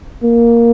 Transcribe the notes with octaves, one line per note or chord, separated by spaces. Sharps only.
A#3